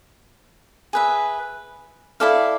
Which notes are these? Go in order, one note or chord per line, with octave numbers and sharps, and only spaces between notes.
G#4 B4 E5
E4 A4 D5 F5